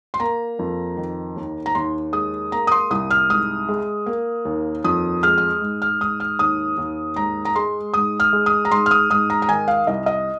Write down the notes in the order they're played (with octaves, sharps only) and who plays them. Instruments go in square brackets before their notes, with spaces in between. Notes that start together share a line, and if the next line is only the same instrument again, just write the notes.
[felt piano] C6
A#3 A#5
F2
D#3
D#2
A#5
D#2 C6
G#3 D#6
A#3 A#5
D#6
C6
C2 D#6
F6
G#2 D#6
G#3
A#3
D#2
F2 D#6
G#3 F6
F6
G#2
F6
G#2 D#6
F6
D#2 D#6
D#2
G#2 A#5
A#5
G#3 C6
G#2 D#6
F6
G#3
D#6
A#5
G#2 C6
F6
D#6
G#2 D#6
A#5
A#5
D#3 G#5
F5
C2 D#5
D#5